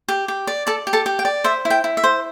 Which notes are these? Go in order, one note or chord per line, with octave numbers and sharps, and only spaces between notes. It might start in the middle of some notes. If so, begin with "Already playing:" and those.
G4
G4
D5
A4 D5 A5
G4
A4 A5
G4
G5
D5
C5 E5
E4
G5
E4
E5
C5